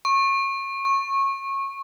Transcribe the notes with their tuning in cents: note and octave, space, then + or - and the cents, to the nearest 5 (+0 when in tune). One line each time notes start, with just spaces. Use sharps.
C#6 -25
C#6 -20